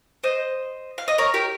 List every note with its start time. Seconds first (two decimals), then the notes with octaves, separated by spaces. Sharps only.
0.23 C5 D#5
0.98 F5
1.08 D#5
1.18 A#4 C#5
1.34 G4 A#4